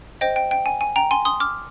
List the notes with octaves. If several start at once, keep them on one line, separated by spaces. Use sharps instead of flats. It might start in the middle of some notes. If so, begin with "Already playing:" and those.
C5 D#5 G5
G5
G5
G#5
G#5
G5 A#5
G#5 C6
C6 D#6
D6 F6